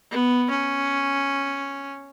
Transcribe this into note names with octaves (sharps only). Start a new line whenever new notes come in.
B3
C#4